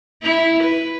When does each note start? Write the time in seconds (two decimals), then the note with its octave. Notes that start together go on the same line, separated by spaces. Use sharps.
0.22 E4
0.64 B4